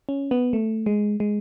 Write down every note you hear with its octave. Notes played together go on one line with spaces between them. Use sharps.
C#4
B3
A3
G#3
G#3